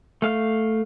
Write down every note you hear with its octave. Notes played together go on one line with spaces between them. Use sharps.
A3 F5